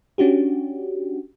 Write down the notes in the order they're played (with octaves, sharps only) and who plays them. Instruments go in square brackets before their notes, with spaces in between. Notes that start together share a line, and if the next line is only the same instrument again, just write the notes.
[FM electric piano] C#4 D4 F#4 G4